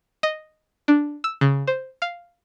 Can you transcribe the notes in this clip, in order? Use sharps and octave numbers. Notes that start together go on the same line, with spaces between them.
D#5
D4
E6
C#3
C5
F5